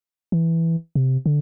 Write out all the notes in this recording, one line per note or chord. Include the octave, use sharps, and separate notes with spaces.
E3
C3
D3